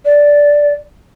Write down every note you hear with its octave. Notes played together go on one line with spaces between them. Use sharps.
D5